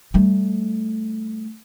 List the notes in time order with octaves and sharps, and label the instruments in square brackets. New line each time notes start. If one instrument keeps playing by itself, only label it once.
[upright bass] G3 A3